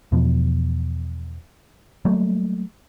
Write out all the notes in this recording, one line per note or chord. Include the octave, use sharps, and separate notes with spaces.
E2 B2 F3 B3
F#3 G3 A3 A#3